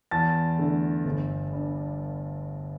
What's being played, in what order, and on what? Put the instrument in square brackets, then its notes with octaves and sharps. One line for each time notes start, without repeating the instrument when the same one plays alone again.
[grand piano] E2 A5 A6
D3 A3
G1
G2 G3